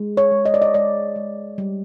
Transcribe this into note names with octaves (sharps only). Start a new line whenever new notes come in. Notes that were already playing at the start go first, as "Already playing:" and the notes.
Already playing: G#3
C#5
G#3
D#5
D5
D#5
G#3 D5
G#3
G3